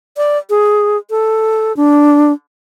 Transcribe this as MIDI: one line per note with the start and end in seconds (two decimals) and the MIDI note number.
0.17 0.38 74
0.50 0.97 68
1.10 1.75 69
1.77 2.32 62